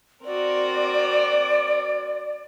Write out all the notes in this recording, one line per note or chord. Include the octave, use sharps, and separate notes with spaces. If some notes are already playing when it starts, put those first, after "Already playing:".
C4 F#4 A#4 D5